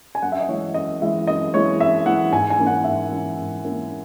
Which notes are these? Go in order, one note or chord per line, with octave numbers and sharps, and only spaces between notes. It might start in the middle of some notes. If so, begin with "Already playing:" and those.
G#5
F#2 F#5
E5
D#5
E3 G#3 C#5
F#2 D#5
E3 G#3 E5
F#2 D#5
E3 G#3 C#5
F#2 E5
E3 G#3 F#5
G#2 G#5
G#5
E3 A#3 C#4
F#5
G#2 E5
E3 A#3 C#4
G#2
E3 A#3 C#4